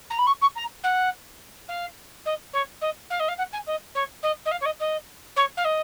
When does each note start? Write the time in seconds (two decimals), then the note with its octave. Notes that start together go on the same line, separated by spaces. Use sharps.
0.10 A#5
0.18 B5
0.26 C#6
0.41 C#6
0.55 A#5
0.83 F#5
1.68 F5
2.25 D#5
2.53 C#5
2.81 D#5
3.10 F5
3.19 D#5
3.28 F5
3.38 F#5
3.52 G#5
3.66 D#5
3.94 C#5
4.22 D#5
4.45 D#5
4.51 F5
4.61 C#5
4.65 D#5
4.79 D#5
5.36 C#5
5.57 F5
5.64 D#5